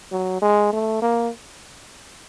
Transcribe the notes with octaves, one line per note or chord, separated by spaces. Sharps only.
F#3
G#3
A3
A#3